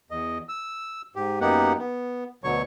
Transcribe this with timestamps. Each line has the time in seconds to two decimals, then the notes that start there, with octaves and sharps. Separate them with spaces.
0.11 E2 D#5
0.49 E6
1.16 G#2 G4
1.41 F#2 A#3 B3 D#4 G4 F#5
1.79 B3
2.44 D2 B2 D3 F#3 C#5 C#6